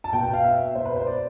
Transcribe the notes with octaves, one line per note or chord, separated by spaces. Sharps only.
A5
B2 G5
G5
F5
E5
B2 C5
B4
C5
D5